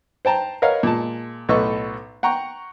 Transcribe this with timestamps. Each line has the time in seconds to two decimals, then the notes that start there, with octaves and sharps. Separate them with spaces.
0.25 C5 G5 A5 A#5
0.62 A#4 B4 C#5 D#5 F5 F#5
0.83 A#2 G#3 A5
1.49 B1 A2 A4 B4 D#5 C#6
2.23 F#5 G5 A#5 C#6